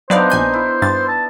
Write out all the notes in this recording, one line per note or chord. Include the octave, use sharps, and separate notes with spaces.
F#3 B3 D4 D#4 C5 D5 F5
A#1 G#5 G6
E4
G2 A6
A5